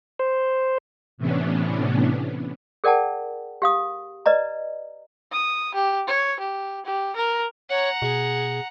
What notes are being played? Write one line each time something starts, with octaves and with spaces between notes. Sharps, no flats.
C5
A2 C3 E3 B3 C#4 D4
G#4 A#4 D5 F#5 G5 A5
G4 F5 D#6
B4 D5 D#5 A#5
D#6
G4
C#5
G4
G4
A#4
C#5 F#5 A#5
B2 G#4